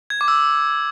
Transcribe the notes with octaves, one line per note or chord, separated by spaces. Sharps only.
G#6
D6
E6